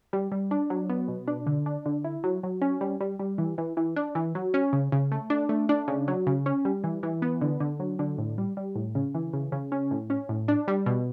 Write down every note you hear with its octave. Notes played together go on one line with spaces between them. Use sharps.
G3
G3
D4
F#3
B3
B2
D4
D3
D4
D3
E4
F#3
F#3
C#4
G3
G3
G3
E3
E3
E3
D4
E3
F#3
C#4
C#3
C#3
A3
D4
A3
D4
C#3
F#3
C#3
C#4
G3
E3
E3
B3
D3
D3
F#3
D3
A2
G3
G3
A2
C#3
E3
C#3
C#3
C#4
A2
C#4
A2
D4
G3
B2